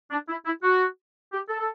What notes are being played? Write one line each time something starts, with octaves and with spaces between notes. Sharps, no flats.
D4
E4
E4
F#4
G4
A4
A4